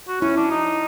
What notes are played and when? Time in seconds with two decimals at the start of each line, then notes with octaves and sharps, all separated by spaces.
0.08 F#4
0.21 C#4 E4
0.37 D4
0.51 D#4